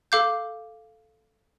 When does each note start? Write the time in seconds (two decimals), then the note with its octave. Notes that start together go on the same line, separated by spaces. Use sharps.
0.12 A4 F5 D6 G6